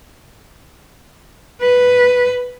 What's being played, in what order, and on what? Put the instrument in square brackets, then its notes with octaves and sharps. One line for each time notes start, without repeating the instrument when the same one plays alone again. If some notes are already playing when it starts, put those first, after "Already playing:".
[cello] B4